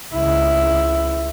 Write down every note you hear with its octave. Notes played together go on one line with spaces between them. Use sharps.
C#2 E4